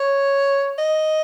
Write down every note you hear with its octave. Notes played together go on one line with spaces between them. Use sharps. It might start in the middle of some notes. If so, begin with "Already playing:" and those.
Already playing: C#5
D#5